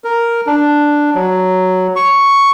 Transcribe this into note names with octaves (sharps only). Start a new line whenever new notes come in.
A#4
D4
F#3
C#6